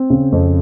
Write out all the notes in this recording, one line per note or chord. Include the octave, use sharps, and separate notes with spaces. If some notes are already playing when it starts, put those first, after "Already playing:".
Already playing: C4
C#3
F2